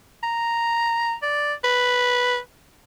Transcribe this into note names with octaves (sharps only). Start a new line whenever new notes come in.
A#5
D5
B4